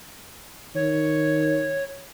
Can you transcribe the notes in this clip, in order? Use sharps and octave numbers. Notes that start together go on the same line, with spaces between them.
D#3 C#5